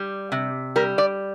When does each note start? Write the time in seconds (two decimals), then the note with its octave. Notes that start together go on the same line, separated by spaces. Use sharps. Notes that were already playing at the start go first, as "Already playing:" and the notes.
Already playing: G3
0.32 C3
0.76 G3 A#4
0.98 D5